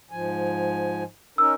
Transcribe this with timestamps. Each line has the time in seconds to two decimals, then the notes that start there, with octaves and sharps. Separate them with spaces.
0.11 G#2 F3 G#5
1.38 C#4 D#4 A#4 E6